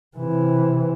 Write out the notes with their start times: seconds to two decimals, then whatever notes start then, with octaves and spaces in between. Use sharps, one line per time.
0.17 C3 E3